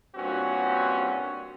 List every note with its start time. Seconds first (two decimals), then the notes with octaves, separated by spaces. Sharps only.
0.15 G2 A#2 C4 C#4 F#4